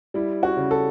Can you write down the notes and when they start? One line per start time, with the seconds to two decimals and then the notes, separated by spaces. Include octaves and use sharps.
0.14 G3 E4
0.43 F#4
0.57 C#3
0.71 A4